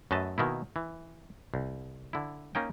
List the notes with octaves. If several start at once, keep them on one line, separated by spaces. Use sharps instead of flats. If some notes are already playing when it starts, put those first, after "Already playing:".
F#2 A3 B4 D#5 A5
B2 D#3 A#3 E4
E3
C2
D3 E4
A#3 C#4 D#4 G5